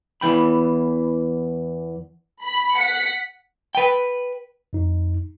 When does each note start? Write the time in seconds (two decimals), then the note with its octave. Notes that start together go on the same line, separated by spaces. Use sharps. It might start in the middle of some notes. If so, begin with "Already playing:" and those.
0.21 E2 E3 G5 B5
2.42 B5
2.75 F#5 B6 C#7
3.75 B4 G5
4.73 F2 D#4